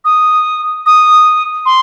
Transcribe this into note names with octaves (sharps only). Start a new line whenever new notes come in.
D#6
D#6
C6